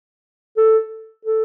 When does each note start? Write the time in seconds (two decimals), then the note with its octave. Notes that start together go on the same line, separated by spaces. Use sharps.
0.57 A4
1.25 A4